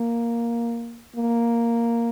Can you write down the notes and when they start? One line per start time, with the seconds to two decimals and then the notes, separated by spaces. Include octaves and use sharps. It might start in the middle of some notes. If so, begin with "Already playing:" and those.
Already playing: A#3
1.16 A#3